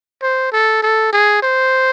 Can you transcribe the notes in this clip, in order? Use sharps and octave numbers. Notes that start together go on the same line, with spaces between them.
C5
A4
A4
G#4
C5